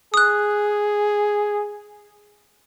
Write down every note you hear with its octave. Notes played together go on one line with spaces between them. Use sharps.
G#4 D#6 F#6